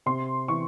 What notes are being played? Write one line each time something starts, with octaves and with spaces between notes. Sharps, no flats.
C3 C6
E3 C#6